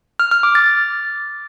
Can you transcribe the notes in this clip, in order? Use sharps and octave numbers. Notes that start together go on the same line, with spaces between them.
F6
F6
D6
A6